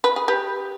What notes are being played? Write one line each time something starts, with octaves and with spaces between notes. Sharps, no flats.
B4
G#4
G4 B4